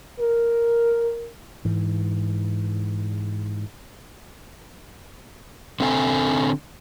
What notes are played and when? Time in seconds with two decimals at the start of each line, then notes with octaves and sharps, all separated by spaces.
0.20 A#4
1.65 G#2 E3
5.80 D3 C4 A4 G#5